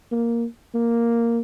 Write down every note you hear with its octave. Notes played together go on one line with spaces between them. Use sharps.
A#3
A#3